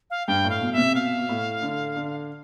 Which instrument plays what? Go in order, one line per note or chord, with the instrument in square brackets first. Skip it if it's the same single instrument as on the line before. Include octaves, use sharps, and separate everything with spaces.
[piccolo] F5
[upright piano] G2 [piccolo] G5
[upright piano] A2
[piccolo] F5
[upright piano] B2
[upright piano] C3 [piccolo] E5
[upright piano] B2 [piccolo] F5
[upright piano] B2
A2
D3
D3